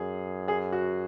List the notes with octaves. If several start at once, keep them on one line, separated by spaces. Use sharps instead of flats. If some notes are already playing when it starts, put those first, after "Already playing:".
Already playing: F#2 G#4
G#4
F#4